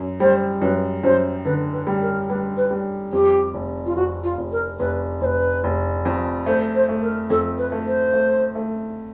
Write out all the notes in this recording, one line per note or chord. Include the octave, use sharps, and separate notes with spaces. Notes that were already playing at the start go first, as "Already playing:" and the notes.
Already playing: F#2
G3 C5
F#2 B4
F#2 C5
D3 B4
B4
G3
A#4
G3 B4
B4
G3
F2 G4
F1
F4
F2 F#4
F4
F1
A#4
F1 B4
F1 B4 C5
F1
F2
A3 C5
C5
A3
A#4
F2 A4
B4
A3
C5
A3
A3